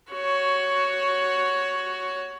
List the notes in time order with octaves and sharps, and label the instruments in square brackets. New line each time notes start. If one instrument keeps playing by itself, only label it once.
[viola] F#4 C#5